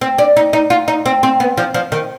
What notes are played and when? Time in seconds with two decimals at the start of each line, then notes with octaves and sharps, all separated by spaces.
0.01 C4
0.18 D4
0.37 D#4
0.53 D#4
0.70 F4
0.88 D#4
1.06 C4
1.23 C4
1.40 B3
1.57 F3
1.74 F3
1.92 D#3